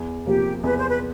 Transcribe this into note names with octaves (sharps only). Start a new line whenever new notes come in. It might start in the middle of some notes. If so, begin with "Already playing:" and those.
Already playing: E2
C3 F3 A#3 G4
E2 B4
C5
B4